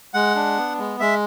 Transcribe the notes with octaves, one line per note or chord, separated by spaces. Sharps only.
G#3 F#5
D4
B3
G#3
G#3 E5